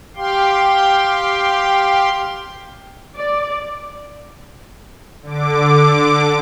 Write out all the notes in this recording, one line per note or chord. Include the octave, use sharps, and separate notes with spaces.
G4 F5 G5 C6
D5
D3 D6